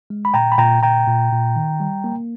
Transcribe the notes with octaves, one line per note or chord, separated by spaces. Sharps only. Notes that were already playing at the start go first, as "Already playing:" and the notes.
G#3
B5
A#2 G5 A#5
B5
A#2 G5 A#5
A#2 G5 A#5
A#2
A#2
D#3
G3
A#3